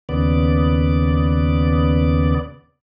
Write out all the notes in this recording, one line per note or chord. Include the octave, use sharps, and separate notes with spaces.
D#2 C#3 B3 D5